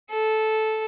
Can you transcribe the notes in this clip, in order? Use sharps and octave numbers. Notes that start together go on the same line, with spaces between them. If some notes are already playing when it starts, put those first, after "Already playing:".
A4